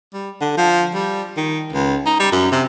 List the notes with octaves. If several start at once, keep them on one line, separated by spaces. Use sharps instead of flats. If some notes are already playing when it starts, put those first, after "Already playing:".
G3
D3
F3
G3
D#3
C#2
D#4
G3
F#2
C3